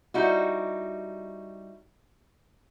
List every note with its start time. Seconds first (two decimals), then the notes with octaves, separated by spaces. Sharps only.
0.14 G3 D#4 E4 F#4